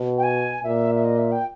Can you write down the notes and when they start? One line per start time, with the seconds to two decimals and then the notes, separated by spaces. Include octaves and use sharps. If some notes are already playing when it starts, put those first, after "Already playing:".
Already playing: B2
0.18 G5
0.23 G#5
0.64 A#2 E5
0.95 E5
1.05 D#5
1.18 E5
1.32 G5